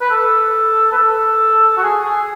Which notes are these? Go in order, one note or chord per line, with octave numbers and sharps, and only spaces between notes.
B4
A4
B4
A4
F#4
G#4
G#4